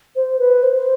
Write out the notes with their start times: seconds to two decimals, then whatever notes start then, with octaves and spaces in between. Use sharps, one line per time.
0.16 C5
0.39 B4
0.63 C5